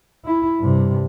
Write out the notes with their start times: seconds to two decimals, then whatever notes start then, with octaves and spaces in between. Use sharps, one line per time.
0.25 E4
0.59 G2 C3